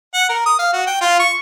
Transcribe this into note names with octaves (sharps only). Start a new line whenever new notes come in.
F#5
A#4
D#6
F5
F#4
G5
F4
C#6